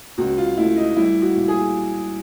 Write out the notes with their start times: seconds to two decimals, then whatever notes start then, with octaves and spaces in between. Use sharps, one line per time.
0.18 C#2 F#4
0.38 F4
0.58 A3 E4
0.76 D#4
0.96 G3 E4
1.22 F#4
1.36 A#2
1.48 G#4